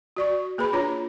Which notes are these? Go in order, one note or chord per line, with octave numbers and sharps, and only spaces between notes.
F#4 D5 C#6
A#3 G#4 B4 B5
D4 F4 C#5 A#5